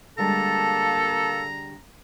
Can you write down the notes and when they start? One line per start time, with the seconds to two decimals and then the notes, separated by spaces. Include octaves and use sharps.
0.18 D3 G3 G#3 A#3 A4 A5 A#5